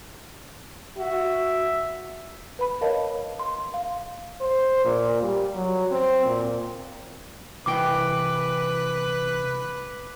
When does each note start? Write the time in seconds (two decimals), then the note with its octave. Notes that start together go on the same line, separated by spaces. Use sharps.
0.97 F#4 E5
2.59 B4 B5
2.81 A#4 C#5 D#5 F5 A5
3.39 C6
3.74 F5
4.41 C5
4.85 A#2
5.23 G3
5.55 F#3
5.91 C4
6.25 A#2
7.66 C2 E3 B4 G5 D6 D7